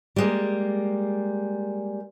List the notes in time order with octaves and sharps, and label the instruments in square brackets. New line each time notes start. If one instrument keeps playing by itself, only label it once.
[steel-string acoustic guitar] G3 G#3 A#3